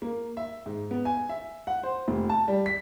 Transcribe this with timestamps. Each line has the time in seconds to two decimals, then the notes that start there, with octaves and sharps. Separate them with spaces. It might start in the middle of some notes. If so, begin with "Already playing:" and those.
0.02 A#3
0.37 E5
0.66 G#2
0.91 B3
1.05 G#5
1.29 E5
1.67 F#5
1.83 C5
2.08 F1
2.29 A5
2.48 G3
2.66 B6